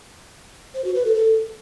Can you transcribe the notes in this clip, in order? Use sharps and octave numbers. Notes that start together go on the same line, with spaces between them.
C5
F#4
B4
A4
A4